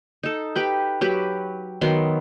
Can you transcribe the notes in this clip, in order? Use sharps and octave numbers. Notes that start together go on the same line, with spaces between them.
D#4 A4
G4 B4 G5
F#3 G4 B4
D#3 F#3 B3 C6